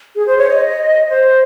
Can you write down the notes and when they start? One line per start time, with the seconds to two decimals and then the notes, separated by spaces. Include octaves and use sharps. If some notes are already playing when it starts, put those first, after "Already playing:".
0.15 G#4
0.27 C5
0.37 C#5
0.49 D#5
1.09 C5